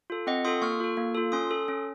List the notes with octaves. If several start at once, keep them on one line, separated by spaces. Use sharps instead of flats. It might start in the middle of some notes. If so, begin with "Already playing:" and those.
F4 A4
C4 D#5 F#5
F4 A4 C6 D#6
A#3 C#6 F6
F4 A4
A#3
F4 A4
C#4 C6 D#6
A4
C#4